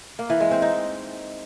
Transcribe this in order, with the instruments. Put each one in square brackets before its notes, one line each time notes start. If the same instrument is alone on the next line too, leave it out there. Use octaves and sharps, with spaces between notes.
[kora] A#3
E3
G#3
C4
D#4